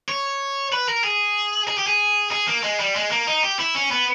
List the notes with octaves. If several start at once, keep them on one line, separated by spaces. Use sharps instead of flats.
C#5
B4
A#4
G#4
G#4
G4
G#4
G#4
A#3
G#3
G3
G#3
A#3
D#4
G4
E4
C#4
B3